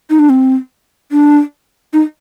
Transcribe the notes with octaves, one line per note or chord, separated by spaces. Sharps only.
D#4
D4
C4
D4
D#4